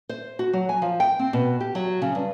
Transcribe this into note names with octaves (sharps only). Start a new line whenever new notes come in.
C5
F#4
F#3
G#5
F3
G5
C4
B2
G4
F#3
C#3
G2